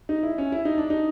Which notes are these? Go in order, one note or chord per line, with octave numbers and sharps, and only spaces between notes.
D#4
E4
C#4
E4
D#4
D4
D#4